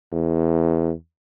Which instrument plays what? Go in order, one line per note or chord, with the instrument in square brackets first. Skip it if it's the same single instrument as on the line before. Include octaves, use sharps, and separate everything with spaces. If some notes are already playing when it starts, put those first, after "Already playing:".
[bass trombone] E2